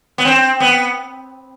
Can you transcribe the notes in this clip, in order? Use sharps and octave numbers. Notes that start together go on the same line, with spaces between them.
B3
C4
B3